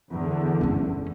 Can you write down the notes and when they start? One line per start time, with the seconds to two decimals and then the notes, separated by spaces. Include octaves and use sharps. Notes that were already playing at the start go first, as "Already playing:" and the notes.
0.10 E2 D3
0.61 F#1 C#4